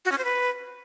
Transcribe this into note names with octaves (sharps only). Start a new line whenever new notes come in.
F#4
C#4
C5
B4